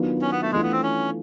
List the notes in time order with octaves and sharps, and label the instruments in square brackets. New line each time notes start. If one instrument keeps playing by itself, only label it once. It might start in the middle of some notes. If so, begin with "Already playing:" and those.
Already playing: [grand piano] D#3 F#3 B3 D4 F4
[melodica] C#4
B3
A3
[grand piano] E3 A3 D4 F4 [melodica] G#3
[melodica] B3
C4
C#4